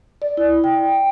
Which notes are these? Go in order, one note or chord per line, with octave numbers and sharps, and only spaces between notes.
D5
E4
G5